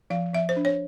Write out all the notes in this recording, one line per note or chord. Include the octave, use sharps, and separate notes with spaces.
F3 F5
F3 E5
C5
D4
C#5